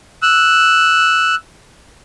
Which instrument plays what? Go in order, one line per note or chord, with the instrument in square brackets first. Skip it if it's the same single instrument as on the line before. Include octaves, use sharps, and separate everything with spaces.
[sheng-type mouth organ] E6 F#6